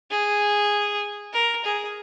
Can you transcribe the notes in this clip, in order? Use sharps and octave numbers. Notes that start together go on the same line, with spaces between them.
G#4
A#4
G#4